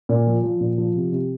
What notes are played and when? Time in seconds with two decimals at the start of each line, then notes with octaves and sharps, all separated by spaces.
0.09 A#2
0.27 F3
0.43 F3
0.61 A#2
0.78 F3
0.96 C3
1.12 C3